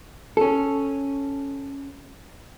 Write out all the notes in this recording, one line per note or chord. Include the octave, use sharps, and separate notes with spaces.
C#4 A4